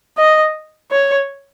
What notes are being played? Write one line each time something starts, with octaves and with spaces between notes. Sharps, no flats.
D#5
C#5